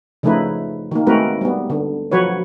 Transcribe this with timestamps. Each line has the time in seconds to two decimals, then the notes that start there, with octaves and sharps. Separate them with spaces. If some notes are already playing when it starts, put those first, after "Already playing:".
0.23 C#3 F3 A3 D#4 E4 B4
0.91 D#3 A#3
1.07 G#3 A3 C4 F#4 A#4 B4
1.41 G3 B3
1.70 D3
2.12 F3 F#3 F#4 B4 C#5